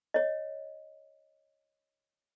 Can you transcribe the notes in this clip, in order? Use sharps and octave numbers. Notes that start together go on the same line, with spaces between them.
C#5 D#5